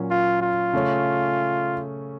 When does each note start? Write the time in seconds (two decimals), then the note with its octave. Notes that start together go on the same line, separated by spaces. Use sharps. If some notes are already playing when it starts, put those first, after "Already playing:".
Already playing: A#2 F#3 A#3 C#4
0.11 F4
0.42 F4
0.73 C#3 A3 C#4